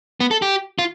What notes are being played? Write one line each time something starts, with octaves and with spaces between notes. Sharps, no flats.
B3
A4
G4
F4